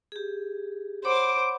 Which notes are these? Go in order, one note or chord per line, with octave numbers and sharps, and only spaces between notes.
G4 G#4
C5 C#5 F#5 B5 D6